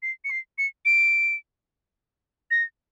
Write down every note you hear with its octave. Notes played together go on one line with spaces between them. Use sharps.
C7
C#7
C7
C#7
D7
A#6